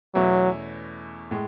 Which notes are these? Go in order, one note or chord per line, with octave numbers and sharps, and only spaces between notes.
E2 B2 F#3 A3 C#4 E4
A2 G#3